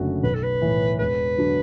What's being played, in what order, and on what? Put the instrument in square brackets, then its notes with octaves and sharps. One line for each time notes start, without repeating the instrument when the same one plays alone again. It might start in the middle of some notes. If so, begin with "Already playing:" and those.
Already playing: [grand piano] F#1 F#2 D3 A3 F#4
[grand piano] B1 [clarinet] B4
[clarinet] A4
B4
[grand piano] A2 E3
[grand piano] E1 [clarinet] B4
[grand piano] D3 F#3 D4